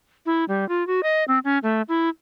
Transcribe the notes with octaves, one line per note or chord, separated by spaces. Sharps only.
E4
G3
F4
F#4
D#5
C4
C#4
A3
E4